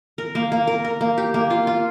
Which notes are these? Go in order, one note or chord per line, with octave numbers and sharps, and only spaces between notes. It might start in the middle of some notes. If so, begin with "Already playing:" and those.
A#4
A#3
A#3
A#4
A#4
A#3
G4
A#3
F4
F4